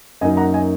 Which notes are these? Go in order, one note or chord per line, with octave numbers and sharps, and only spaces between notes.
F#2 F#3 A#3 D#4 D#5 G#5
F#5 A#5
D#5 G#5